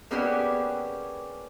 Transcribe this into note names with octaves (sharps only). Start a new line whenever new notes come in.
A#3 B3 C#4 D4 G4 G#4